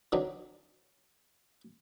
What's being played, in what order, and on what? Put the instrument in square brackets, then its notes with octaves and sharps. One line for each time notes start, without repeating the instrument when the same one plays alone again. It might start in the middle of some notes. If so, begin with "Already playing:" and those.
[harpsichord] D3 E3 F#3 C4 D4 D#4